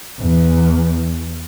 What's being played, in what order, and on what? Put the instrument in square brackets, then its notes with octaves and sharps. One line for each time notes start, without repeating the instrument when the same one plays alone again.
[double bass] E2